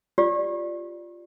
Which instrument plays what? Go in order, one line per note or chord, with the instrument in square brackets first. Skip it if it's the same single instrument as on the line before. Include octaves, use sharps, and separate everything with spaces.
[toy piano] F4 G4 D5